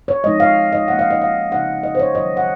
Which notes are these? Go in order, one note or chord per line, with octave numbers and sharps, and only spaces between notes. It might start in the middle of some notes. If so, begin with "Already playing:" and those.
C#5
F3 G#3 C4 D#4 D#5
F5
D#5
F3 A#3 C#4 F#5
F5
D#5
F5
C#3 F3 C4 D#4 F#5
D#5
C5
C#5
D#3 F#3 C4 D#5
F#5